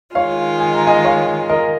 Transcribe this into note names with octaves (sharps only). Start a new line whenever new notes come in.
D#3 G#3 F4 C#5 F5
G#5
A#5
D#5 G#5
C#5 F5
A#4 D#5